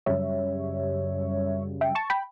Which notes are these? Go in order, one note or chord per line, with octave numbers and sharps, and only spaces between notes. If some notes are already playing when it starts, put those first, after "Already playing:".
F#2 C#3 G3 C#5 E5
E5 G5
A5 C#6
G5 B5